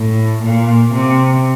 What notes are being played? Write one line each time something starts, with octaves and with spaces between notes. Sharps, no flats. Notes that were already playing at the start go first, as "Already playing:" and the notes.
Already playing: A2
A#2
C3